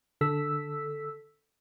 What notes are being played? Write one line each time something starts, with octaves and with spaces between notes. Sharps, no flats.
D3 A4 E6 B6